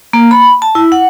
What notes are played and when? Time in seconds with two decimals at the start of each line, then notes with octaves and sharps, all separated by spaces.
0.13 A#3
0.31 B5
0.62 A5
0.75 E4
0.92 F#5